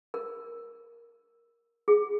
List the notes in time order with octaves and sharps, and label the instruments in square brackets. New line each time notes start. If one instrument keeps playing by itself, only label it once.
[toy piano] A#4
G#4